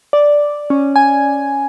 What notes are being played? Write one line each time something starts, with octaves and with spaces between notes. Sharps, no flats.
D5
C#4
G#5